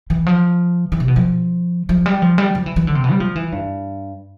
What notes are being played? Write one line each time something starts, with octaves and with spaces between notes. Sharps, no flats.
E3
F3
E3
C3
B2
F3
F3
G3
F3
G3
F3
E3
E3
D3
C3
B2
G3
F3
E3
G2